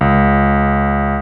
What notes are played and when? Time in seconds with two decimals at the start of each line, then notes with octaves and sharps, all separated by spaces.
0.01 C#2